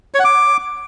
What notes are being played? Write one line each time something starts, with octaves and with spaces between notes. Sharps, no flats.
C#5
F#5
D6